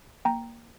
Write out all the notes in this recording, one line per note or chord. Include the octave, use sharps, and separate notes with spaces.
A#3 G5 A#5